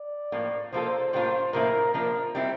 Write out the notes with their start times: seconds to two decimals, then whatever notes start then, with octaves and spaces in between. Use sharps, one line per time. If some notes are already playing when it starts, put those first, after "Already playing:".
Already playing: D5
0.32 A2 F3 A#3
0.72 F3 A#3 F4 A4 C5
1.13 A2 G3 A#3 D4 F4 C5
1.53 A2 F3 A#3 E4 A#4
1.94 F3 A#3 D4 A#4
2.35 G3 C4 E4